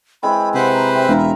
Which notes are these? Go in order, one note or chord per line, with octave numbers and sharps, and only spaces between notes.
E3 G#3 C4 B5
C3 B4 C5 F#5
A#5
C4 E5 B5
E1 F4 A#4 F5